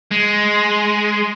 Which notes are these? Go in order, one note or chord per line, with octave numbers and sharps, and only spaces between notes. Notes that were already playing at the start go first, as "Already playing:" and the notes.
G#3